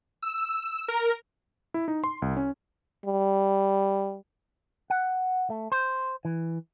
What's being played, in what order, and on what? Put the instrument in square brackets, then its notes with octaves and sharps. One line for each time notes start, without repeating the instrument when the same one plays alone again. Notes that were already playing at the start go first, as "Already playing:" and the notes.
[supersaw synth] E6
A#4
[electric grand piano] E4
D#4
C6
C2
C#4
[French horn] G3
[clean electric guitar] F#5
A3
C5
E3